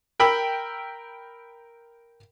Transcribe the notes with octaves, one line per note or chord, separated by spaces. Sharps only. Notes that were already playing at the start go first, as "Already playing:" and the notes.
A#4 G5 B5 E6